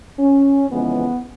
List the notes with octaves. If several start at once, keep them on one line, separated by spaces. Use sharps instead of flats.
C#4
F2 C#3 E3 G#3 B3